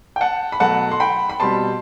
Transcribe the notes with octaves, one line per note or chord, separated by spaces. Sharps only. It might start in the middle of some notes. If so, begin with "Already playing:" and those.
G5
F#5 A5
B5
B2 F#3 A3 F#5 A5
C6
G5 B5
B5
B2 G3 C4 A5 C6